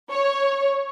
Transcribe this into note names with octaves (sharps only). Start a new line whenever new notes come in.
C#5